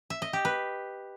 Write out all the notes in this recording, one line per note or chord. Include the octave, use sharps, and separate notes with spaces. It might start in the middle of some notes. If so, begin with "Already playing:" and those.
E5
D#5
G4
B4